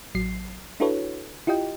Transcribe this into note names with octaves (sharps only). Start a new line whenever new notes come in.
A1 F#3 C7
D4 E4 F#4 A4 B4 C#5
E4 F4 G4 D#5 G5